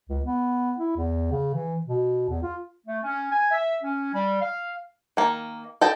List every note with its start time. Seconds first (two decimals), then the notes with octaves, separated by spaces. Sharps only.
0.10 C#2
0.25 B3
0.79 E4
0.97 E2
1.32 C#3
1.55 E3
1.87 B2
2.30 E2
2.43 F4
2.86 A3
3.03 C#4
3.31 G#5
3.51 E5
3.83 C#4
4.13 G3
4.41 F5
5.17 D#3 A#3
5.81 A4 D#5 G5